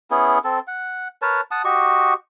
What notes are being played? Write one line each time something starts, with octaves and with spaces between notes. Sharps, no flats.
B3 C#4 E4 G#4
C4 A4
F#5
A#4 B4 C#5 A5
F#5 A5 D#6
F#4 G4 D#5 C#6